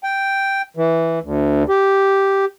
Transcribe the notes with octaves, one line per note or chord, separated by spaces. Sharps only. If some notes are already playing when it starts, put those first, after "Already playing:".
G5
E3
D2
G4